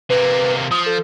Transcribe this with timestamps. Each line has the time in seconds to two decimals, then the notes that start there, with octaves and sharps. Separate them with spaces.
0.10 C3 A#3 B4
0.71 F3 D#6
0.86 A4